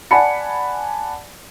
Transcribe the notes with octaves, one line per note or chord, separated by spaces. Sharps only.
D5 F#5 G#5 A5 B5 C#7